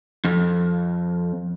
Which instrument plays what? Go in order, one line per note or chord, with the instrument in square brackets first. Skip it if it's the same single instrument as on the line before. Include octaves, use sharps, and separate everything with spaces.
[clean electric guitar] F2